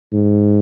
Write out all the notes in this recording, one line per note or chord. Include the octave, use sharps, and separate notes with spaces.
G#2